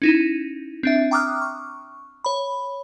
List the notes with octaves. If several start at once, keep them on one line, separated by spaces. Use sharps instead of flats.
C#4 D#4 E4
C4 D4 E5
G5 A#5 D6 D#6 F6 F#6
C#6
C#5 B5